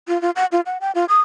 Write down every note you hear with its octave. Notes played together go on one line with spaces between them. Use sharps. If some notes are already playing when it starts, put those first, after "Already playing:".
F4
F4
F#5
F4
F#5
G5
F4
D#6